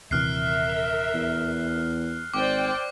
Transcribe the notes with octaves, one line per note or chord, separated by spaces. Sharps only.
D#1 C3 E3 A#4 E5 F6 F#6 C7
E2
G#1 C5 D5 G5 D6